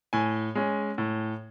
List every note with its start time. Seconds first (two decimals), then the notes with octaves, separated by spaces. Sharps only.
0.13 A2 G#5
0.55 G#3 C#4
0.98 A2